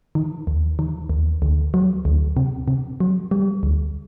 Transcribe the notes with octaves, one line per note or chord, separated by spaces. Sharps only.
D#3
D#2
D#3
D#2
D2
F#3
D2
C3
C3
F#3
G3
D2